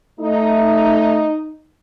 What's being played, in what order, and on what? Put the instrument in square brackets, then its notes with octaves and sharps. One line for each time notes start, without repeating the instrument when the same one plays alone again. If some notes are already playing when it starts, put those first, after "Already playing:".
[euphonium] A3 [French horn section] D#4